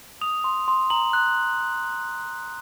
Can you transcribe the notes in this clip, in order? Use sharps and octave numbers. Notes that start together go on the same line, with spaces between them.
D#6 F7
C6
C6
A#5 F#7
F#6